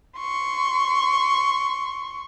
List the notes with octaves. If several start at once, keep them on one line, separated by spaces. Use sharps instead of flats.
C6 C#6